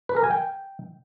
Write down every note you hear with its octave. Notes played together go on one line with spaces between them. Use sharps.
B4
A#4
G#5
G5